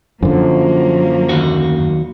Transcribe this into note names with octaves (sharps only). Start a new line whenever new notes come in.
F#2 D3 F3 F#3 A#3
D#2 F#4